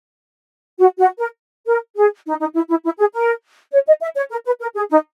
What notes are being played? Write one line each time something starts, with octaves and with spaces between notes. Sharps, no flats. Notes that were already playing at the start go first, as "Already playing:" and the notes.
F#4
F#4
A#4
A#4
G#4
D#4
D#4
E4
E4
E4
G#4
A#4
C#5
D#5
E5
C#5
A#4
B4
A#4
G#4
D#4